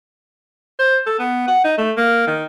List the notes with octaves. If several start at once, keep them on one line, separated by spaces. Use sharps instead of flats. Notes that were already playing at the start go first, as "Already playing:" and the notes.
C5
A4
B3
F#5
D#4
A3
A#3
D#3